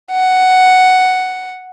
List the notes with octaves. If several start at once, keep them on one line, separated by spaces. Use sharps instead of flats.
F#5